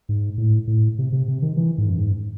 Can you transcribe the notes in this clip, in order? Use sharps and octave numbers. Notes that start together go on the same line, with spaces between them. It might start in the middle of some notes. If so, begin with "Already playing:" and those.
G#2
A2
A2
C3
C3
C3
D#3
E3
G#2
F#2
G#2